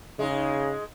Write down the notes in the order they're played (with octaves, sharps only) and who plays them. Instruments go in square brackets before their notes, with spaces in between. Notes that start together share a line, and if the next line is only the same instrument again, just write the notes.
[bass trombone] C#3 [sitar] G#3 D#4